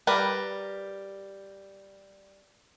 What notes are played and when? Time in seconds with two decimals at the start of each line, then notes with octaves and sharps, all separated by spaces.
0.07 G3 A#4 B4